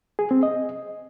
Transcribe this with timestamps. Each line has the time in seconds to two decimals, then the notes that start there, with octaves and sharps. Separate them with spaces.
0.19 G#4
0.31 C4
0.43 D#5